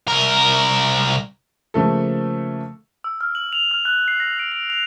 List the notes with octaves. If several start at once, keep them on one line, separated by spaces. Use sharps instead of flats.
C2 A#4
C#3 F3 A3 A#3 A4
E6
F6
F#7
F7
F6
F#6
C7
A#6
D7
D7
F7